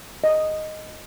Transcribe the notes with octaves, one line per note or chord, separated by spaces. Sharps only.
D#5